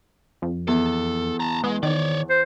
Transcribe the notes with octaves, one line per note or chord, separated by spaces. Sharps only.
F2
E2 A4
A5 A#5
G#3 B3
D#3 C#5 D5
C5